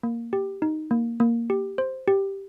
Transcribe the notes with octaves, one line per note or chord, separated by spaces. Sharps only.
A#3
G4
D#4
A#3
A#3
G4
C5
G4